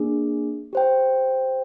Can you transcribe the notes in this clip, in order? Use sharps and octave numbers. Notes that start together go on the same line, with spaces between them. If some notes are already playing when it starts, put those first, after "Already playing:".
Already playing: A#3 D4 G#4
G4 C5 G5